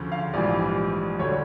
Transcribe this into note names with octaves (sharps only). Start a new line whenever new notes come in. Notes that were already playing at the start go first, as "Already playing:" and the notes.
Already playing: D2 C#3 F3 A3
F5
A#1 G#2 E3 G3 D5
D2 D3 G3 C#5